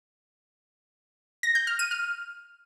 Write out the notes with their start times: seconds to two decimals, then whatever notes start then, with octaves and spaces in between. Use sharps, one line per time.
1.43 A#6
1.55 G6
1.67 F6
1.79 D#7
1.91 F6